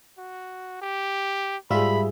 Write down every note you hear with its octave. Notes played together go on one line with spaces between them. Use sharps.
F#4
G4
G#2 G3 F4 G#4 E5 B5